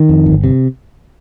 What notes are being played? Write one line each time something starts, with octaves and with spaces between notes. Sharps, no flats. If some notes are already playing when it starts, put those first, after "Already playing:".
Already playing: D#3
F2
G1
C3